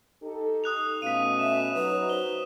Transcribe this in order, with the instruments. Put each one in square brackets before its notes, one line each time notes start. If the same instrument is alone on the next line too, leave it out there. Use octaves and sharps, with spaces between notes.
[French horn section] D#4 G4 A4
[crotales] D#6 F#6 F7
[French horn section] B2 A3 C#4 [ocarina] F5 [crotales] B6 D#7
[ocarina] E5 [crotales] E7
[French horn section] F#3 D#4 [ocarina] B4
[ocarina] C5 [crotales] G7